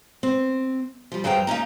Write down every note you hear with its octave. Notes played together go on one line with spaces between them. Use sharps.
C4
F3 G3
G2 F#3 G#4 C5 G5 A#5
A#3 C#4 D#4 A#5